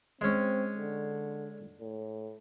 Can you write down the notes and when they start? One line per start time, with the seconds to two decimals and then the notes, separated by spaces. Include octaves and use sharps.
0.21 G#3 C4 C#4
0.76 D3
1.81 A2